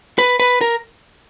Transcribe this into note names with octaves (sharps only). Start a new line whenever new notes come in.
B4
B4
A#4